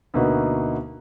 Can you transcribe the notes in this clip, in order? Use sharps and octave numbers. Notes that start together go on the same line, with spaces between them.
D2 B2 A#3 D#4 F#4 B4